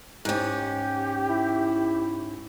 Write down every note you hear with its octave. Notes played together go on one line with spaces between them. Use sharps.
G#2 C#4 G4
E4